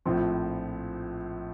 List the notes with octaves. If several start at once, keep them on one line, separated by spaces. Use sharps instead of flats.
A#1 A2 F3 C4